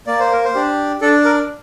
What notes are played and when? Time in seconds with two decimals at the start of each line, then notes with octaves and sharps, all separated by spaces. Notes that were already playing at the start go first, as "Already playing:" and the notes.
0.07 A#3 D5
0.20 C5
0.33 A#4
0.45 C5
0.55 D4 G4
1.01 D4 A4
1.25 A#4